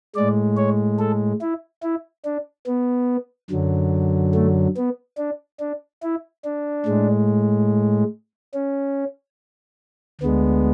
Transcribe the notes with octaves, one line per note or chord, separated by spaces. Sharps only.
A2 G#3 D5
C#5
A4
E4
E4
D4
B3
F#2 D3 F#3
A3
B3
D4
D4
E4
D4
A2 G#3
C#4
D2 D3 G#3 B3